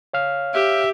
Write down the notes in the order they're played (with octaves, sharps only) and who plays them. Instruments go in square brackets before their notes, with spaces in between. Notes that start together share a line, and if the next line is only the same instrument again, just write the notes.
[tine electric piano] C#5 F5 F6
[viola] G4 [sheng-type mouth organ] E5